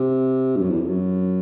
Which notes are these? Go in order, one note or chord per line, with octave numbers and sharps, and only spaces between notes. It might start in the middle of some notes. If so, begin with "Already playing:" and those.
Already playing: C3
G2
F#2
E2
F2
F#2